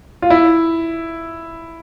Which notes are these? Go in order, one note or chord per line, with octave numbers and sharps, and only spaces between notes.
F4
E4